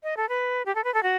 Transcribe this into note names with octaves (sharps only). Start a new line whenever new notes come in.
D#5
A4
B4
G4
A4
B4
A4
F#4